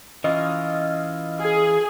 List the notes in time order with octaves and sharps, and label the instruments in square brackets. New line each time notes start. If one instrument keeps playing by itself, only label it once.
[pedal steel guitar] E3 C#4 F4 [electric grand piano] D#5
[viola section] G#4